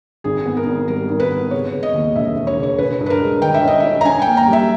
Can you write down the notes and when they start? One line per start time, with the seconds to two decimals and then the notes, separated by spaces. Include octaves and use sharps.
0.24 G#1 G#4
0.46 B3
0.57 A#4
0.67 G#1
0.88 G3 A#4
1.09 G#1
1.20 B4
1.31 B3
1.51 C#3 C#5
1.73 C#3
1.83 D#5
1.94 D#2
2.15 E1 E5
2.36 E1
2.47 C#5
2.58 C#3
2.63 C#5
2.78 C#4 B4
3.00 G2
3.06 B4
3.10 A#4
3.20 G#3
3.42 D#3 G5
3.54 E5
3.63 C#4 D#5
3.80 C#4 E5
4.01 A#5
4.05 C#4 G#5
4.22 A#3 G5
4.37 A#5
4.48 G3
4.53 E5